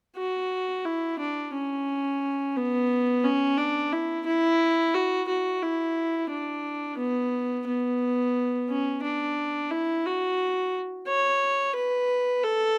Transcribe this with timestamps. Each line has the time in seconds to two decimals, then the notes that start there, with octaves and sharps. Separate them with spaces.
0.17 F#4
0.85 E4
1.19 D4
1.54 C#4
2.56 B3
3.24 C#4
3.58 D4
3.93 E4
4.26 E4
4.94 F#4
5.28 F#4
5.62 E4
6.30 D4
6.98 B3
7.67 B3
8.69 C#4
9.03 D4
9.70 E4
10.06 F#4
11.07 C#5
11.75 B4
12.43 A4